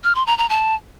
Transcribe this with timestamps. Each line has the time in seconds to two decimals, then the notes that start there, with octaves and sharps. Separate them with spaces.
0.04 F6
0.15 C6
0.27 A#5
0.38 A#5
0.49 A5